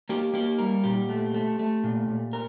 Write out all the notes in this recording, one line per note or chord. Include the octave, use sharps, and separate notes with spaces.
A#3 G4
A#3 G4
G3 A#4
A#2 G4
A3
A3
A3
A#2
A#2
A#4